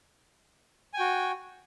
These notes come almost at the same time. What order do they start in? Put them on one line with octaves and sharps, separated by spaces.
G#5 G5 F#4